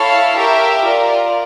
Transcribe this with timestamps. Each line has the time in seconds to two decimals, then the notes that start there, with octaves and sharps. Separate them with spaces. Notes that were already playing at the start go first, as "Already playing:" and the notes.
Already playing: E4 A4 C#5 F5 A5
0.36 G4 A#4 E5 G5
0.85 F4 A#4 D5